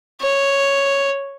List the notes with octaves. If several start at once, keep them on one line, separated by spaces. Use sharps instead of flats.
C#5